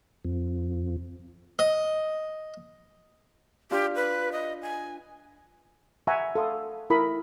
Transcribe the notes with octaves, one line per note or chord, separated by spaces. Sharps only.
F2
D#5
D4 F4 G4 F6
B4
D#5
G#5
E5 F#5 G#5 A#5 C#6
A4 F5 C6 D#6
E4 A#4 B5 D#6